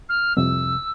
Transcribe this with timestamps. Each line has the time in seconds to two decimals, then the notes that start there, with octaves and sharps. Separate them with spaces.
0.09 F6
0.37 C2 F2 C3 E6